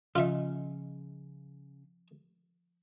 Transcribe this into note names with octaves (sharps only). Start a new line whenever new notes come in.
C#3 F3 F4 D#5 E5